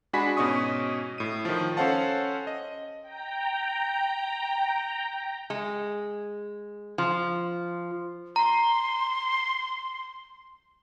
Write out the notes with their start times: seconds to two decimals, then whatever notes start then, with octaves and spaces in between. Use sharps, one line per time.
0.13 G#3 D4 F#4 G#5 B5 B6
0.37 G#2 B2 C#4 D#5 C#6 D#6
1.18 A2 D#7
1.45 D#3 F3
1.77 C#4 A4 C5 F5 F#5 A5
2.47 D#5
3.01 G5 A#5
5.50 G#3
6.98 F3
8.36 A#5 C6